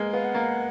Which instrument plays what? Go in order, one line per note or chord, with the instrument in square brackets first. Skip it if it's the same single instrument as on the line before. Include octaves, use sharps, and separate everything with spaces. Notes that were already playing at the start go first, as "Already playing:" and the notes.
Already playing: [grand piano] G#3 A#3 B3
[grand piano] B3 [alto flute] F5
[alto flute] F#5
[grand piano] A#3